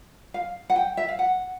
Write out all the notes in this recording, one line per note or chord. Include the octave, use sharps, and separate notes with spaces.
F5
F#5
G5
E5
F5
F#5